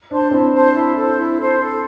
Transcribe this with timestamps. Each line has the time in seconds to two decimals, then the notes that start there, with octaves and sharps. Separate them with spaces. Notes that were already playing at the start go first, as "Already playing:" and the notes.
0.10 D4 C5 A5 C6
0.31 C4 E4
0.53 C5 A5 C6
0.74 E4
0.95 A4 C5
1.16 E4
1.36 A4 C5
1.58 A4